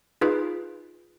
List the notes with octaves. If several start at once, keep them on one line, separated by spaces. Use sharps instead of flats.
D#4 F4 G#4 B4